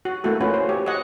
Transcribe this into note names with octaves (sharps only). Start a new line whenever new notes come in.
F#4
A3 A#3 E4 F#4 A4
C#4 F4 F#4 B4
C5
G4 C#5
C#5 D#5 F#5